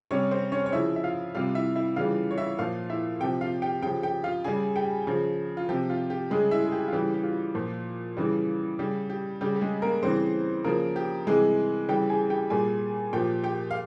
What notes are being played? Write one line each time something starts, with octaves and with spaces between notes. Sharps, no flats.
C3 G3 C#4 C#5
C4 C5
C#4 C#5
C#5
C#3 F3 E4 E5
E5
F4 F5
C3 G3 F4 F5
E4 E5
E4 E5
C#3 E3 G3 F4 F5
C#5
E4 E5
A#2 F3 F4 F5
E4 E5
C3 F3 G4 G5
F4 F5
G4 G5
C#3 F3 G4 G5
G4 G5
F4 F5
C#3 G3 G#4 G#5
G4 G5
C#3 F3
F4
C3 F3 G4
F4
G4
C#3 G3 G#3 G#4
E4 E5
G#4
G4
F4
C#3 E3 G3 G4
G4
F4
A#2 F3
C#3 E3 G3
C#3 G3 G4
G4
C#3 G3 G4
G4
G#3 G#4
A#3 A#4
C#3 E3 G3 C4 C5
C#3 F3 A#3 A#4
G4
C3 E3 G3 G#3 G#4
C#3 E3 G3 G4 G5
G#4 G#5
G4 G5
A#2 G3 G#4 G#5
A#2 F3 G4 G5
G4 G5
F5